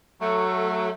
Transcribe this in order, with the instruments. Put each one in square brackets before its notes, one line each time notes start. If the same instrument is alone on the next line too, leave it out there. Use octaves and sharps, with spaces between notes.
[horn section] F#3 A3